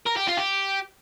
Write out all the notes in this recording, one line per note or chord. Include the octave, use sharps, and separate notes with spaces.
A#4
G4
F4
G4